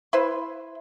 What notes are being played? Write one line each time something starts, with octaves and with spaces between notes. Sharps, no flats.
E4 B4 C5